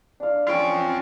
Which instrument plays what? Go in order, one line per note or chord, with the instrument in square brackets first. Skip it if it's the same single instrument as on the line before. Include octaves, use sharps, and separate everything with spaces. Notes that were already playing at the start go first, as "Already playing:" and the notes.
[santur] D4 F5
[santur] C#4 C#6 E6 [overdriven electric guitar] F4 G5